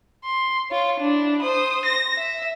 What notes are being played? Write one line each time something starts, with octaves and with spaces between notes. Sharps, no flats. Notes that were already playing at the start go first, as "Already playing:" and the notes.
C6
F4 C#5
D4 E4
C5 D#6
A#6
E5